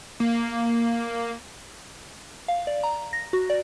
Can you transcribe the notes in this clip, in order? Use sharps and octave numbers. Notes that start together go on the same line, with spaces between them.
A#3
F5
D5
A#5
A#6
F#4
D5